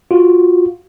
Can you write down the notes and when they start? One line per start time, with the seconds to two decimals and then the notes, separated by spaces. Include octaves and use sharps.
0.11 F4 F#4